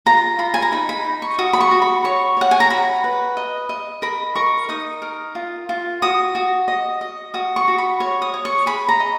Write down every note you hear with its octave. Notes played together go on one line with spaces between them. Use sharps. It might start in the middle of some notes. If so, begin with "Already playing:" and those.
F4 A#5
F4 B5
G#5
A#5
D#4 B5
B5
D#4
C#6
F#4 D#6
B5
C#6
F#4
B5
C#5 C#6
C#5 F#5
G#5
A#5
F#4 B5
B4
D#5
D#5
A#4 B5
A#4 C#6
D#4 D#6
A#4
F4
F4
F#4 D#6
F#4
D#5
D#5
F#4 D#6
C#6
F#4
B5
C#5 C#6
D#6
C#5
C#6
G#4 B5
A#5
D#5